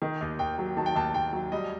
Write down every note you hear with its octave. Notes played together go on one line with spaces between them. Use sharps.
D#3
D#2
D#2 G5
F#3
D#3 A5
G5
D#2 A5
D#2 G5
F#3
G3 D#5